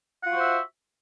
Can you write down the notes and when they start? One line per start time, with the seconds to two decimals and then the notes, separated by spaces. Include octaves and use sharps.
0.21 F#5
0.25 F4
0.30 F#4
0.34 C5
0.39 E5